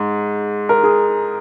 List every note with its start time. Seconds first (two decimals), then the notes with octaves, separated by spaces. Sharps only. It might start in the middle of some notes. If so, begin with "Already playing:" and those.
Already playing: G#2
0.69 A#4
0.83 G#4